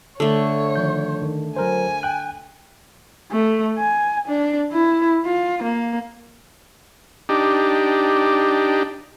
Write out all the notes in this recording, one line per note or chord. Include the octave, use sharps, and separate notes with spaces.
D3 A3 A4 C#5
D#3 F3 G6
D#3
F#3 A#4 C5 G#5
G5 F#6
A3
G#5
D4
E4
F4
A#3
D4 D#4 G4